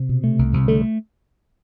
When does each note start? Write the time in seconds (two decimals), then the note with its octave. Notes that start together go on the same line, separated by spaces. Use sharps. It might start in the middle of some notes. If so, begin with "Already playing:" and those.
Already playing: C3
0.09 B2
0.24 A3
0.39 C2
0.53 C2 C3
0.68 D3 A3